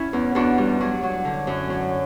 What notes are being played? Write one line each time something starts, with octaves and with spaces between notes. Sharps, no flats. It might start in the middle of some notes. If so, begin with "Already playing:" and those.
Already playing: C#4 E4
E2
E2 D4 F#4
G3
F#3 D4
F#3
D3
F#2
F#3